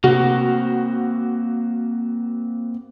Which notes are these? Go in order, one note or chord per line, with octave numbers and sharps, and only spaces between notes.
C3 A3 A#3 C4 D4 F#4